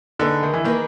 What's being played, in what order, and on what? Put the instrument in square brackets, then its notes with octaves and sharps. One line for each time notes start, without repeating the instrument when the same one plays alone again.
[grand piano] D3 [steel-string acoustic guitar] A#3 D#4 G#4 B4
[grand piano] D#3
E3
[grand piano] D#3 [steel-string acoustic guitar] A#3 D#4 G#4 B4